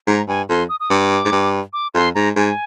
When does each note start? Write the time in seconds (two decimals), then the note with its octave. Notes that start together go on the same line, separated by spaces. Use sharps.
0.07 G#2 A#5
0.28 G2 G#5
0.49 F2 C6
0.69 D#6
0.80 D#6
0.90 G2 D6
1.25 G#2
1.32 G2
1.73 D6
1.94 F2 C6
2.15 G#2 A#5
2.36 G#2 G#5